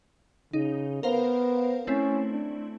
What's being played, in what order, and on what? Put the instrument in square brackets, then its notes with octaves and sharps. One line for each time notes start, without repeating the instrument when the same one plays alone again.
[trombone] C#3 [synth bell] D#4
[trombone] B3 [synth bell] A#4 C5 F5
[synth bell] A3 C4 E4 [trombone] C#4
[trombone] D4